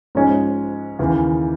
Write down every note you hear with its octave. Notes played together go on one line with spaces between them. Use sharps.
G#2 F3 G#3 C#4
D#2 C#3 E3